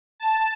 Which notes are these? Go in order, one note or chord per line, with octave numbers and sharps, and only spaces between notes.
A5